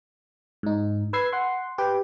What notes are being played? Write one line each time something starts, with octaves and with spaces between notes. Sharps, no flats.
G#2 D#4
B4 E6 G#6 C7
F#5 C6
G4 B4 G5